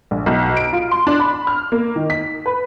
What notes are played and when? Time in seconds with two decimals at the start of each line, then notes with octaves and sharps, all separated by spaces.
0.11 A#1
0.26 B1
0.57 D7
0.73 F4
0.91 C6
1.07 D4
1.20 B5
1.47 F6
1.72 A#3
1.96 D#3
2.10 B6
2.46 B4